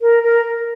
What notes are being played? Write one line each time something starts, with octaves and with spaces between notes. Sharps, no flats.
A#4
A#4